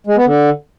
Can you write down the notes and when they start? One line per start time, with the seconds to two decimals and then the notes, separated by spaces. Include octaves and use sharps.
0.07 G#3
0.16 B3
0.25 D3